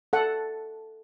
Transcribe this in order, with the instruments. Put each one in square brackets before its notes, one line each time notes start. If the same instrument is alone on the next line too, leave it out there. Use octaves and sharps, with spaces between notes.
[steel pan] A4 F#5